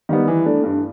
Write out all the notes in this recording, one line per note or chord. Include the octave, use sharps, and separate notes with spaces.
D#3 G3 B3
E3
A3 D4
G2